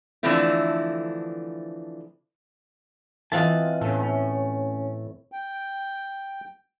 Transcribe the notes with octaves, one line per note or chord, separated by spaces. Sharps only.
D3 E3 F3 A3 C4 E4
E3 C4 F4 D#5 F#5 A5
A2 C#4 A4
C#4
G5